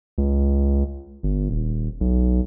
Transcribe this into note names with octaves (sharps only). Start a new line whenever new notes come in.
C#2
G1
D#1
B1